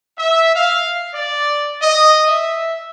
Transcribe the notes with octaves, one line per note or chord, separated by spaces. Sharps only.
E5
F5
D5
D#5
E5